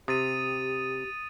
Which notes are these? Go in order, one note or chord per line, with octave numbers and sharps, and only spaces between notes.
C3 G4 D#6 A6 D#7